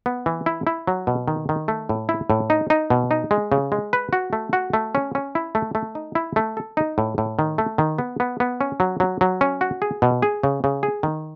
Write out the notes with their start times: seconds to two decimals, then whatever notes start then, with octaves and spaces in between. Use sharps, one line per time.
0.06 B3
0.26 E3
0.46 E4
0.67 E4
0.87 F#3
1.07 B2
1.28 D#3
1.49 D#3
1.68 A3
1.89 A2
2.09 E4
2.30 A2
2.50 D#4
2.70 D#4
2.90 B2
3.11 D#4
3.31 G#3
3.52 C#3
3.72 G#3
3.93 B4
4.13 F#4
4.33 A3
4.53 F#4
4.73 A3
4.95 C#4
5.15 C#4
5.35 E4
5.55 A3
5.75 A3
5.95 D#4
6.15 E4
6.36 A3
6.57 A4
6.77 D#4
6.98 A2
7.18 A2
7.39 D#3
7.58 A3
7.78 D#3
7.99 B3
8.20 B3
8.40 B3
8.61 C#4
8.80 F#3
9.00 F#3
9.21 F#3
9.41 C#4
9.61 F#4
9.82 G#4
10.02 B2
10.22 G#4
10.43 C#3
10.64 C#3
10.83 G#4
11.03 D#3